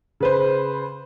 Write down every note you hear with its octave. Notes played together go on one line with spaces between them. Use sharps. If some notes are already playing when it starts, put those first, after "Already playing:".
C#3 B4 C5